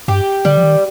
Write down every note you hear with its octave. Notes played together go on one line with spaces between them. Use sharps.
G2 G4
D3 G3
F3
D#3